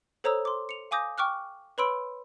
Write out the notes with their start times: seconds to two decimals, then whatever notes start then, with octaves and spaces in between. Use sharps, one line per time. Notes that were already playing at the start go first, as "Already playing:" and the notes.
0.24 A4 C5 C#5 A#5 D#6 E6
0.45 C6 D6
0.69 C#7 F7
0.91 F5 G#5 D6 D#6 G6 A#6
1.18 G5 C#6 D6 F6 F#6
1.78 B4 C#5 B5 C6 E6 D7